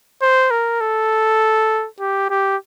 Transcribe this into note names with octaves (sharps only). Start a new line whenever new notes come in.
C5
A#4
A4
G4
G4